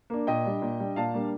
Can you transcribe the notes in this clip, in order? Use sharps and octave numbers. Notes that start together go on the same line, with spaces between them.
A#3 D4
A#2 D#5 G5
G3 D4
A#2
G3 D4
A#2 F5 A5
G3 A#3 D4